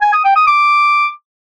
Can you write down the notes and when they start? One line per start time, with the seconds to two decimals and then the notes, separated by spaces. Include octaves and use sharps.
0.02 G#5
0.13 D#6
0.24 G5
0.36 D#6
0.47 D6